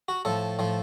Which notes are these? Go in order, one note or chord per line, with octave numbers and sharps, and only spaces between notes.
F#4
A2 F3 A4
A2 F3